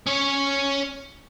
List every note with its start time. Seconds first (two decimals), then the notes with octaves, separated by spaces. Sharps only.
0.07 C#4 C#5